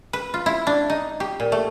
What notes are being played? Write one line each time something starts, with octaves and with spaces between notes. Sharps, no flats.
B4
F4
E4
D4
D#4
G4
A#2
A3